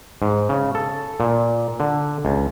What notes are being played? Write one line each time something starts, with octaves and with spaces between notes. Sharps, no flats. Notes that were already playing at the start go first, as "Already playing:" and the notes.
G#2
C#3
A4
A#2
D3
C#2